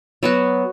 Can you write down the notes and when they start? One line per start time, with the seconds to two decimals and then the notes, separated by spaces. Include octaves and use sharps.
0.23 F#3 B3 F#4